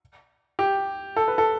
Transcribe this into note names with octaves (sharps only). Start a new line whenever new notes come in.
G4
A4
B4
A4